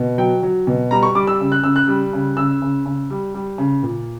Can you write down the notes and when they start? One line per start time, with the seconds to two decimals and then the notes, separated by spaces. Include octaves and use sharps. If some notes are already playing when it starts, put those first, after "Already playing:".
Already playing: B2
0.18 F#3 G5
0.43 F#3
0.67 B2
0.91 G3 A#5
1.03 C#6
1.15 G3 D6
1.27 E6
1.40 C#3
1.52 F#6
1.64 C#3 E6
1.76 F#6
1.88 G3
2.13 C#3
2.37 C#3 E6
2.62 C#3
2.86 C#3
3.10 G3
3.34 G3
3.58 C#3
3.83 A#2